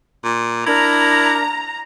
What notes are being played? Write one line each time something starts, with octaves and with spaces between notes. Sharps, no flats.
A#2
D4 E4 A#4 A#5